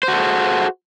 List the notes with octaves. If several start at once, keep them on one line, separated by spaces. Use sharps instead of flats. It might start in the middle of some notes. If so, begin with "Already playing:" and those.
F#4 G#4 A4 C5